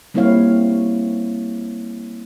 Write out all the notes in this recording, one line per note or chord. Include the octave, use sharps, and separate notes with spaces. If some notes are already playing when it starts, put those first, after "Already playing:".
G3 A#3 C4 E4 C#5 F5